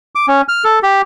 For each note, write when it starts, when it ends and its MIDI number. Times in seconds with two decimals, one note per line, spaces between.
0.15 0.26 86
0.28 0.42 61
0.49 0.64 89
0.64 0.79 69
0.83 1.02 67